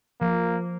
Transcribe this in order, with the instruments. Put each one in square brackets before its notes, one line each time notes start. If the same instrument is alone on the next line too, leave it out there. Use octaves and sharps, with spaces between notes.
[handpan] F3 [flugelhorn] A#3